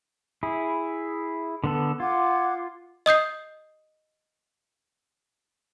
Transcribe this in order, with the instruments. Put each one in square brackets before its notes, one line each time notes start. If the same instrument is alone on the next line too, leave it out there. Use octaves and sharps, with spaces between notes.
[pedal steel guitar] E4 G#4
D3 B3 A4
[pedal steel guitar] F4 [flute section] F#5 D6 G#6
[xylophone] D#5 D#6 G6 C7